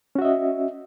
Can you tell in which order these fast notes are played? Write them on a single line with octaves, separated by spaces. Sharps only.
C#4 F#4 E5 D#5